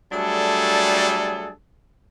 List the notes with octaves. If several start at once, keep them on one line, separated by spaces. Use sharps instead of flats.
F#3 G3 A3 D4 G#4 A4